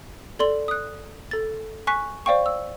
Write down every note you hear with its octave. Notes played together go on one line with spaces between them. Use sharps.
A4 D5 C6 F#7
D#6 F#6
A4 A6
G#5 C#6 F#6 B6
C5 D5 F5 G5 C#6
E6